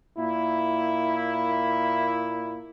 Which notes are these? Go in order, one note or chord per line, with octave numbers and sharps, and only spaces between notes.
A#2 A#3 E4